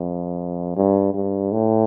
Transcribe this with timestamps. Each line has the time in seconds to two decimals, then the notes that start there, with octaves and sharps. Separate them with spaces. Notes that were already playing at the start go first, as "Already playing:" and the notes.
Already playing: F2
0.76 G2
1.14 G2
1.52 A2